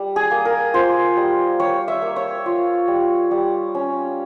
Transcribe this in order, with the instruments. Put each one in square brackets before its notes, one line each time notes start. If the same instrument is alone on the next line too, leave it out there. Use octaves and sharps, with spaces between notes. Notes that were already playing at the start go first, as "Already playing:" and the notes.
Already playing: [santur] G3
G#4
A#3
A#4
F4 C5
G3
G3 C#5
E5
A#3
C#5
F4
G3
G3
C#4